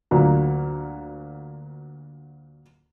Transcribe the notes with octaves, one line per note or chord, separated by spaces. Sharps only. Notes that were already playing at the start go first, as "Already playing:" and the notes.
D2 A#2 F#3